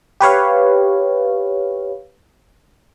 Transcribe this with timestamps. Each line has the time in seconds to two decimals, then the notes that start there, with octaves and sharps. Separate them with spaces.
0.20 G4 B4 C#5 F5